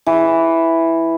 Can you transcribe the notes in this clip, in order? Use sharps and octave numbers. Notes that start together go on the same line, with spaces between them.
E3